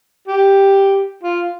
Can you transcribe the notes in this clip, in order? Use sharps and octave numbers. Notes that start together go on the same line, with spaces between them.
G4
F4